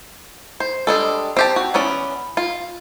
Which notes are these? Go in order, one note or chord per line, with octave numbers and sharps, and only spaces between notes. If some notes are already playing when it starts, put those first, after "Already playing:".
C5
G3 G#3 D4 A4
C4 G4 A5
F#4
E3 B3 C#4 D5
F4